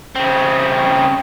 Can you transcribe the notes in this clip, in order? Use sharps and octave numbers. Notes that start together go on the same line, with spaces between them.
C#3 C4